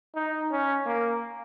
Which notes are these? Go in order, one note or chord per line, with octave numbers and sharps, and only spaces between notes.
D#4
C#4
A#3